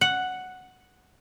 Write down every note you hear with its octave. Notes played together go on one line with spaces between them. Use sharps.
F#5